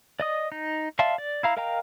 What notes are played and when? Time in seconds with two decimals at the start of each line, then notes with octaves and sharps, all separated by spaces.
0.20 D5 D#5 D#6
0.52 D#4
0.99 D5 E5 F5 A5 C6
1.18 D5
1.43 E4 F5 A#5
1.57 A#4 D#5 F5 G5 A#5